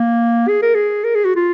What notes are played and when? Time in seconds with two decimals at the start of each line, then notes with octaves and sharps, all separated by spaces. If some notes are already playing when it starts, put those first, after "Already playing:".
Already playing: A#3
0.48 G#4
0.62 A#4
0.75 G#4
1.04 A#4
1.15 G#4
1.25 F#4
1.36 F4